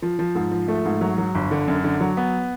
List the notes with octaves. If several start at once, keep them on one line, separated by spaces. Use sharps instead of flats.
F3
F3
G#2
F3
A3
G#2
F#3
F#3
G1
D3
F#2
D3
F#3
B3